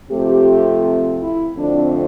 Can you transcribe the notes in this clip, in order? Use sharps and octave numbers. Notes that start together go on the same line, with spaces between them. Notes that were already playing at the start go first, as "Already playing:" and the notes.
C3 F3 A3 C4 G4
E4
F2 D3 A3 C4 D4